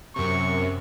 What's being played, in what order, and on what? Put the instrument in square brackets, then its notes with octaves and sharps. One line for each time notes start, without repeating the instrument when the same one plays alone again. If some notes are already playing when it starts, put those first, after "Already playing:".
[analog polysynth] F#2 C3 [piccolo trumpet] C#6